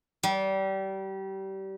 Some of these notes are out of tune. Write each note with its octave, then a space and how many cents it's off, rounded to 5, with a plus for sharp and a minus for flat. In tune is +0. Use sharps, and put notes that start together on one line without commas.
G3 -25